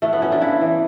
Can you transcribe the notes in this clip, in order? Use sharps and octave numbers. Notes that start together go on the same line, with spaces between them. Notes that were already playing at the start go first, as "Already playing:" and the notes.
A2 A3
B3
F#3 C#4
D4
C#3 E4
E3